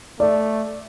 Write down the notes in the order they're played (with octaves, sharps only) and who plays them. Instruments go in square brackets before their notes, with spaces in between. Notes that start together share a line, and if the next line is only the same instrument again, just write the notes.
[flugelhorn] A3 [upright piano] D5